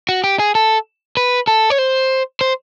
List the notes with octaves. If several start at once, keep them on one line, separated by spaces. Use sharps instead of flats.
F#4
G4
G#4
A4
B4
A4
C#5
C5
C5